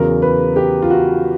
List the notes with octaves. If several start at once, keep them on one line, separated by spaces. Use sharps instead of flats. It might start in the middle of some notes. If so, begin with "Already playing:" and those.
Already playing: E2 C#3 F#3 A#4
B4
G4
F4
F#4